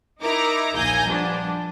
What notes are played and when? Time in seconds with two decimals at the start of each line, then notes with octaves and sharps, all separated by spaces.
0.21 D#4 E4 A#4 A#5 D6
0.75 A#1 D#2 F5 G#5 G6 A#6
1.04 F3 G3 B3 D4